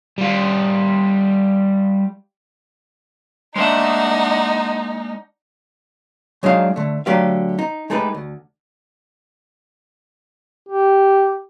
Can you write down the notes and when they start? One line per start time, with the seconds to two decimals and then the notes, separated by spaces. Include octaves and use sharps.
0.18 G3 F4
3.56 G#3 A#3 D4 D#4 E5 F#5
6.43 F#3 G#3 D4 D#4 F5
6.76 D3 A3
7.06 D3 F#3 A3 G4 D5 F5
7.59 D#4
7.90 G#3 A3 D#4 G4 B4
8.14 D2
10.69 G4